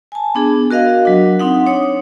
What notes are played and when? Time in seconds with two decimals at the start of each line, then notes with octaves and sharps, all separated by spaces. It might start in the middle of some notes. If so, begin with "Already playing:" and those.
0.12 G#5 A5
0.35 B3 D4 G#4
0.71 F#4 A#4 D#5 F5
1.05 F#3 D4
1.40 C4 D#4 F#5
1.66 D4 C#5 D#6